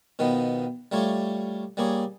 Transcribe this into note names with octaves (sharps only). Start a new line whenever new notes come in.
B2 D#3 F3 B3
G3 A3 F4 C#5
G3 A#3 G#4 C#5